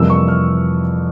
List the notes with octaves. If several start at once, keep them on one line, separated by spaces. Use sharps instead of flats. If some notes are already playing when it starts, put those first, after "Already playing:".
Already playing: F2 C3 E3 G3 A#3 E6
C#6
F6